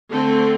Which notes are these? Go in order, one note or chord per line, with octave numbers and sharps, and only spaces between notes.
D3 A3 C4 A4